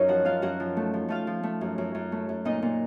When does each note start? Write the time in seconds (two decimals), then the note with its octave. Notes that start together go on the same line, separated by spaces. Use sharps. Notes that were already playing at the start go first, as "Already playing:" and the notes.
Already playing: F#2 D#4 A#4 C#5 D#5
0.08 F3 F#4 F#5
0.25 F#2 F4 F5
0.42 F#2 F#4 F#5
0.60 F3
0.77 A3
0.94 F3
1.09 A3 F4 F5
1.27 F3
1.43 A3
1.61 F#2
1.78 F#2
1.95 F#2
2.12 A3
2.29 F#2
2.45 A#2 D#4 D#5
2.62 A#2